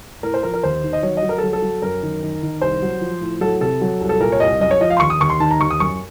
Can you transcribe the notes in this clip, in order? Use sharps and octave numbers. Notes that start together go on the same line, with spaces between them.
A2 A#4
C5
F3 A#4
A#4
D#2 C5
D#3
D#5
F#3 C#5
D#5
F#3
A#4
A4
F#3
A4
F#3
F#2 A#4
D#3
D#3
D#3
C2 C5
F#3
F3
A2
F#3 A4
C3 A4
F#3
C2
A4
A#2 A#4
C#5
C2 D#5
F#2 D#5
C#5
F3 D#5
F5
C6
D#2 C#6
D#6
D#2 C#6
C6
D#3 A5
A#5
D#2 C#6
D#6
F#2 C#6